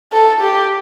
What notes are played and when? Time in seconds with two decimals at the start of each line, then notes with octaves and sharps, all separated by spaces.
0.13 A4
0.41 G4